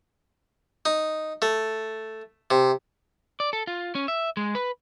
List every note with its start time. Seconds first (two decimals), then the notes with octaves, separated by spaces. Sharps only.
0.86 D#4
1.42 A3
2.51 C3
3.40 D5
3.53 A4
3.67 F4
3.95 C#4
4.08 E5
4.37 G#3
4.55 B4